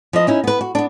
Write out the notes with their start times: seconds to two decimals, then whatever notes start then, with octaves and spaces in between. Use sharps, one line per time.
0.13 F3 B4 D#5
0.27 C#4 D#4 E4
0.44 B3 B4
0.61 F#4
0.75 B3 D4